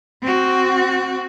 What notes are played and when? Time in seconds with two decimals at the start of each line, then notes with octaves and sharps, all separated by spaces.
0.22 C4 F#4